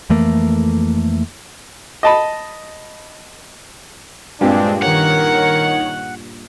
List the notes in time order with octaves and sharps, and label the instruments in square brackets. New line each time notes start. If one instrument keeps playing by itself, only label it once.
[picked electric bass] F2 E3 A3 A#3
[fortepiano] D#5 A5 B5
[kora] G2 A#2 G4 [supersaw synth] G#3 C4 [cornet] D4
[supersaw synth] D#3 C#5 [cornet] A#4 [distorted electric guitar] F#5